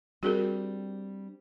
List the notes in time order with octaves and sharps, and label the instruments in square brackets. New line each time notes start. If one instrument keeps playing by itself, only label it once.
[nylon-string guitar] G3 C4 D4 [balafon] F#4 G#4 A#4